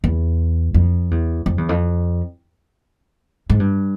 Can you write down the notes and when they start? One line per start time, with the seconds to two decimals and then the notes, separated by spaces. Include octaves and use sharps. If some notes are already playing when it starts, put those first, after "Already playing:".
0.04 E2
0.74 F2
1.11 E2
1.46 F2
1.58 E2
1.69 F2
3.50 G#2
3.60 G2